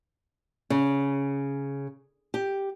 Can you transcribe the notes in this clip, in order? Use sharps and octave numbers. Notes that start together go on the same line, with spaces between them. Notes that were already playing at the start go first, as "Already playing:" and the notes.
C#3
G4